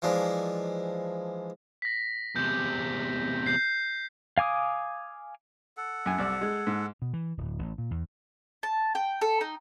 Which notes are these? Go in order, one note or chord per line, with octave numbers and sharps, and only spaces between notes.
E3 F3 G#3 D4
A#6 B6
E2 C3 G6
G6 C7
F5 G#5 D6 D#6
A4 F#5
F#2 G#5
C2 D5 E6
G#3
G#2
B2
E3
D1
A1
A#2
E2
A5
G5
A4
D#4